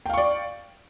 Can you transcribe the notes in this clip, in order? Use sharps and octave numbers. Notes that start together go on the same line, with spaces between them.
D5 F5 G5 C#6